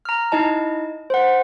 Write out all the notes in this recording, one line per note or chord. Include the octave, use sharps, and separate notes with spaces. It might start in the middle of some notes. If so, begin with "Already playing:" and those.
A#5 F6
D#4 E4 D#5 A5
C5 F#5